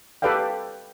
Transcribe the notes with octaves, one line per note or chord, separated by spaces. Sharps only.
G4 A4 B4 D5 F5 G5